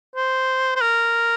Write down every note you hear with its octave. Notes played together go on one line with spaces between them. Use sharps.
C5
C5
A#4